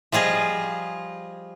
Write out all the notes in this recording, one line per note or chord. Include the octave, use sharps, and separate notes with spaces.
F3 G3 F4 G#4 D#5